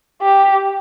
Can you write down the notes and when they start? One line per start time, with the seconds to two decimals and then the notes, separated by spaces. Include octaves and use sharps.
0.22 G4